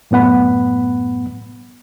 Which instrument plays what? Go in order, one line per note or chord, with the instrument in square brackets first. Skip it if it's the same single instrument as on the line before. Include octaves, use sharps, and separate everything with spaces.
[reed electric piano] F#2 A2 B3 F#5 B5